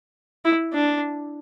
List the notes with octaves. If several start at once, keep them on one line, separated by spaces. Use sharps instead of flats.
E4
D4